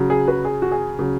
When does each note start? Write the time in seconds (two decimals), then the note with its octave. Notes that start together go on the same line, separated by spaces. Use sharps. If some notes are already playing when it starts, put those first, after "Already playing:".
Already playing: C#3 F#3
0.10 G#4
0.27 F#4 B4
0.45 G#4
0.62 F#4
0.71 G#4
0.99 C#3 F#3